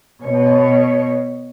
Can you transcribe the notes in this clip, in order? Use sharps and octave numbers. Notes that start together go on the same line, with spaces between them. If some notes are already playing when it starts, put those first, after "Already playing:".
B2 C#5